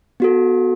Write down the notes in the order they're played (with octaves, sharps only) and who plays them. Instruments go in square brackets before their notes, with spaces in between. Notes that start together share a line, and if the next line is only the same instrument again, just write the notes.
[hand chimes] B3 F#4 A4